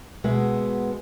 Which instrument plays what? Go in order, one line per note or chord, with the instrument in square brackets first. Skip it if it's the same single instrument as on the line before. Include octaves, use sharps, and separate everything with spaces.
[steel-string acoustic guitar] B2 G#3 B3 E5